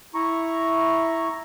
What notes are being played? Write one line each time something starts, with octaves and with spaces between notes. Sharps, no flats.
E4 A#5 C#6